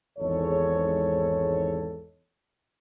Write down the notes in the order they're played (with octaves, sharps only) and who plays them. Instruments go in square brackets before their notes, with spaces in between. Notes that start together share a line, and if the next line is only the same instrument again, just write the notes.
[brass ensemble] G#1 E2 G#2 G#3 A4 C#5